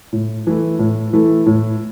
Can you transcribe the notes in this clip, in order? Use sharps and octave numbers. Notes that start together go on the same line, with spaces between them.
A2
E3 A3 E4
A2
E3 A3 E4
A2